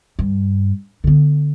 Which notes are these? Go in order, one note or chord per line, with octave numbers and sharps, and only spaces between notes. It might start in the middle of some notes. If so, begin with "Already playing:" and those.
G2
D3 B3